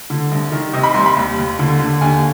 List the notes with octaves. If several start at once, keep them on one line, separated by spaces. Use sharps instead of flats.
D3
C2
D#3
C3 D#5
B5
C2 C6
B5
D#2
D#2
D3
D3
D#2 G#5